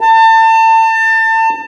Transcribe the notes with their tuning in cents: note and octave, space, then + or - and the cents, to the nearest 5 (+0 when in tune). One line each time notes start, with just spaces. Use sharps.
A5 +30